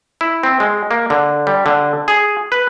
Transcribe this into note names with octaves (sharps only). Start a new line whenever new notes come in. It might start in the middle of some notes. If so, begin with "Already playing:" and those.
E4
C4
G#3
A#3
D3
G3
D3
G#4
B4